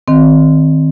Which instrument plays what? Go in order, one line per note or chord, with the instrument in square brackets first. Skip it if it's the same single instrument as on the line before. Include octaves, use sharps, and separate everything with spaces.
[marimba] D#3 C4